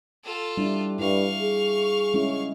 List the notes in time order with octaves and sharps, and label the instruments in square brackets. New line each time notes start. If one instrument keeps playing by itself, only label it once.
[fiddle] F4 A4
[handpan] G3 D4 E4
[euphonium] G2 [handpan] E4 [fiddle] F5 C#6
[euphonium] G#4
[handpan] G#3 C#4 E4